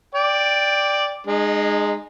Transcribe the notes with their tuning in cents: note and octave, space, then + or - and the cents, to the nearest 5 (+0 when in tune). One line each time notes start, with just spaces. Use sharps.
D5 +0 G5 +10
G#3 +0 D#4 -35